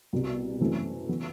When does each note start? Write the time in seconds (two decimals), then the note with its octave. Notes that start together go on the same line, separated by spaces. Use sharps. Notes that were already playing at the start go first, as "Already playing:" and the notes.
0.13 C2 B2 G3
0.60 F#2 E3 A3 C4
1.09 E3 B3